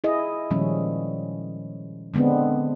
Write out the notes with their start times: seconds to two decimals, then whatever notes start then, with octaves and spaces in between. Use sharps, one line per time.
0.04 E4 G#4 D#5
0.51 A#2 D#3 F3 G3 G#3 C#4
2.14 D3 G#3 B3 C4 D4